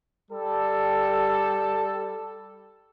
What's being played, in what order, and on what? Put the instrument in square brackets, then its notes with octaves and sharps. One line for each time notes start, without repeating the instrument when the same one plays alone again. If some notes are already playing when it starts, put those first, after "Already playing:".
[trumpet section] G3 A4